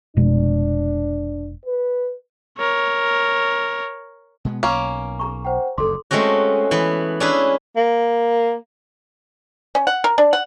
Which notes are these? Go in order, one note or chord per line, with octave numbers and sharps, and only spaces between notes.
F1 B2 G#3 D4
B4
A#4 C#5
B2 G#3 B3
B1 A#3 C#4
G#4 A#5 C#6
C5 F#5 G5
F#1 D2 G2 A4 C6 D6
G#3 A3 C4 C#4 F#4
E3 B3
C#4 D4 E4 G#4 B4
A#3
C#4
F#5
A#4
D4
F#5